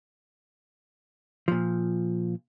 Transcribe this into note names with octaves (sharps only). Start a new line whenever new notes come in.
A#2 F3